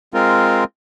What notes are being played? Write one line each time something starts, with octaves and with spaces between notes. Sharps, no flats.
G#3 C4 F4 A#4